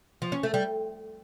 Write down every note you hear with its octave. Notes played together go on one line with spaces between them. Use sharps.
F3
C#4
A3
G3